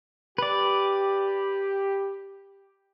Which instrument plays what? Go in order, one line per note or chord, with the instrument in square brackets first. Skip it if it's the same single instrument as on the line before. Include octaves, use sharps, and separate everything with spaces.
[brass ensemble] G4 [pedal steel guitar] B4 D5